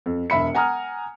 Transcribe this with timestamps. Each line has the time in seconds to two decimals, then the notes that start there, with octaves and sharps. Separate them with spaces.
0.06 F2
0.30 E1 E5 B5 C#7
0.54 F#5 G#5 A#5 D#6 F6